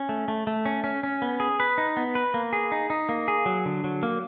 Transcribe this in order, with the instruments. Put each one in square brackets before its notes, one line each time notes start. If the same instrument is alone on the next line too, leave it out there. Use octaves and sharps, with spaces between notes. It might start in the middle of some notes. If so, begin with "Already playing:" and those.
Already playing: [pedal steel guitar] C#4
A3
A3
A3
C#4
C#4
C#4
B3
G#4
B4
D#4
B3
B4
A#3
G#4
D#4
D#4
A#3
G#4
F#3
D3
F#3
A#3